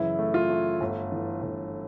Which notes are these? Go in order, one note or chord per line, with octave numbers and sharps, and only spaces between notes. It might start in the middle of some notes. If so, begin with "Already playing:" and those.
Already playing: F#2 C#3 E3 E4
A3
F4
A3
G1
E3
G1